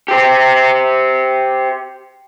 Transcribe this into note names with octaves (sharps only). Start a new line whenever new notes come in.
G4 C5